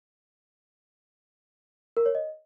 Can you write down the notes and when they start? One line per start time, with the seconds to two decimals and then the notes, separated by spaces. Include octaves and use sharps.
1.97 A#4
2.06 C#5
2.15 D#5